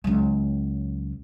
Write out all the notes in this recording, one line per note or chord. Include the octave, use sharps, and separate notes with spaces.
C#2 F#3